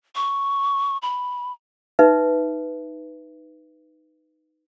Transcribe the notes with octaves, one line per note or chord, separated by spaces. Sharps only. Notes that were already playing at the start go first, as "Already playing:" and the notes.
C#6
B5
D#4 B4 E5